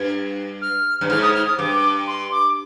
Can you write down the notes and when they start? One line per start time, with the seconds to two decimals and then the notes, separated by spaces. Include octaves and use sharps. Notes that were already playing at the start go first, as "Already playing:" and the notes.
Already playing: G2
0.62 F6
1.01 G2
1.10 G#2 F6
1.22 D#6
1.34 F6
1.46 D#6
1.58 G2 D6
2.07 C6
2.32 D6